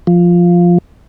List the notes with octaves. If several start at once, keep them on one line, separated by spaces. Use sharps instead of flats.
F3